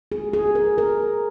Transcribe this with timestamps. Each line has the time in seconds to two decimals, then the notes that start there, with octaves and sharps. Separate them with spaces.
0.12 G#4
0.33 G#4
0.55 A#4
0.78 A#4